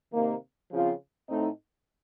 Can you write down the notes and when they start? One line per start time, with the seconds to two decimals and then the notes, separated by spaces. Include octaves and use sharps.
0.13 C3 D#3 A#3
0.71 C#3 F3 C4 F4
1.28 A2 A3 C4 D#4